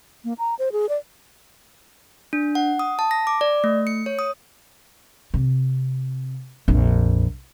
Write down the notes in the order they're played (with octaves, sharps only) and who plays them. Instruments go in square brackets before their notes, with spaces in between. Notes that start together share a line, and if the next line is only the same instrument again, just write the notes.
[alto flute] A#3
A#5
C5
G#4
D5
[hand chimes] D4
F#5
D#6
A5
A#6
D6
D5
A3
C#7
C#5
D#6
[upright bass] C3
A#1 F2